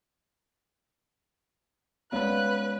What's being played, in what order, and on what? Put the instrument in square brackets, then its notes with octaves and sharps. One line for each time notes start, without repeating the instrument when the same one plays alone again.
[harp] G#3 F4 [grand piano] B3 C#4 D5 [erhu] B4 [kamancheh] F#6